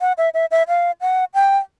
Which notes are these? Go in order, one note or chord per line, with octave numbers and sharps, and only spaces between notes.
F#5
E5
E5
E5
F5
F#5
G5